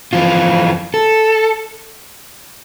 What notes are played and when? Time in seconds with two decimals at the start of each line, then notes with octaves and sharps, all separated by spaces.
0.13 F2 E3 F4
0.94 A4